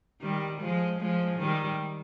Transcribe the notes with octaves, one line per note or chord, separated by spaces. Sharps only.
D#3 G3
F3 G#3
F3 G#3
D#3 G3